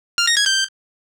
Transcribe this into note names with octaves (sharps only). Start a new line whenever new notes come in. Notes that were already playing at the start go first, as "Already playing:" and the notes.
F6
A#6
G#6
G6